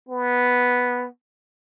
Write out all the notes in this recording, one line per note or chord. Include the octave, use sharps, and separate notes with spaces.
B3